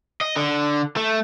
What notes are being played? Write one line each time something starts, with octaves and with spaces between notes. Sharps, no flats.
D#5
D3
A3